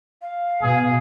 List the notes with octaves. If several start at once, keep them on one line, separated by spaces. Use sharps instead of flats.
F5
B2 G#4